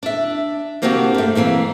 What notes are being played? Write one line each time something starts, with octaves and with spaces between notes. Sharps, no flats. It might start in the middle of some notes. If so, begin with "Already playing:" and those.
D4 E5
C3 A#3 C4 D4 F#4 G4
G2 A3
E3 G#3 A#3 C4